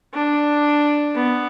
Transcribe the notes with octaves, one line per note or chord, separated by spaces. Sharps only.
D4
B3